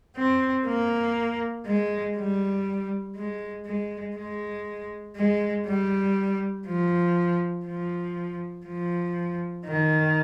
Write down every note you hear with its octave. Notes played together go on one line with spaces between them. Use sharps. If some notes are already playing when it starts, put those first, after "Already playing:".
C4
A#3
G#3
G3
G#3
G#3
G#3
G#3
G3
F3
F3
F3
D#3